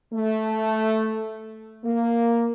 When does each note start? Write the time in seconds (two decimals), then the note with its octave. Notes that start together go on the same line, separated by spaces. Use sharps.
0.13 A3
1.84 A#3